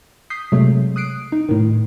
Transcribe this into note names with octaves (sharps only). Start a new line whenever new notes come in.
D#6 G6 B6 C7
C3 F#3 G#3 A3
D#6 F#6 C7 D7
D#4
A2 D#3